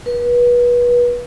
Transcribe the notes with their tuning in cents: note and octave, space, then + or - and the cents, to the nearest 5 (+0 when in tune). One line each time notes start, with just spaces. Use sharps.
B4 -30